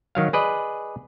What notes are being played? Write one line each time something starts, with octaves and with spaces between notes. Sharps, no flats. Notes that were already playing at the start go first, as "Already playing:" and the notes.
D#3 F#3 F5
G#4 B4 D5 D#5